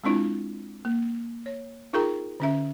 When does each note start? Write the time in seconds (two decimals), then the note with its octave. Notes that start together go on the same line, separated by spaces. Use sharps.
0.04 G#3 C4 D4 E4 F4
0.85 A#3
1.46 C#5
1.93 D#4 F4 G#4 A#4 G5 A#5
2.40 D3 C#4 E5